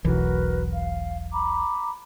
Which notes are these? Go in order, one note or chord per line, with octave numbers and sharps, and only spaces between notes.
E1 B1 E3 F#4 A#4 B4
F5
A#5 B5 D6